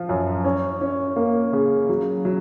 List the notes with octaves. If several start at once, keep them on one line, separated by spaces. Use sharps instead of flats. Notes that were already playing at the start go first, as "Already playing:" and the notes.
Already playing: F3 F4
F#2
C#4
C#4
A#3
C#3
F#3
F#3